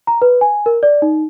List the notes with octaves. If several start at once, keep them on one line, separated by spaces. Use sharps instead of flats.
A#5
B4
G#5
A#4
D5
D#4